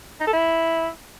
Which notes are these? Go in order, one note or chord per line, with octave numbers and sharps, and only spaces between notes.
D#4
A4
E4